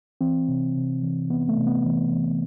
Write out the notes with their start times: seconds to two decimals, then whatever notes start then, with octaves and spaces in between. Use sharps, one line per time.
0.21 E3 C4
0.48 C3
0.76 C3
1.03 E3
1.30 E3 B3
1.49 A3
1.57 C3
1.67 B3
1.85 E3
2.12 E3